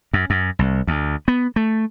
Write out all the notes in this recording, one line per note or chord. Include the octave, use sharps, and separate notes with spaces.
F#2
F#2
C2
D2
B3
A3